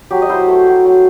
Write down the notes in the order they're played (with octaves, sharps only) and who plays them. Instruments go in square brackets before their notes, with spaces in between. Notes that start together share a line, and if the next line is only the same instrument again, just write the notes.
[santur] F#3 G4
D#5
E4 C5
A3
F#3
F#3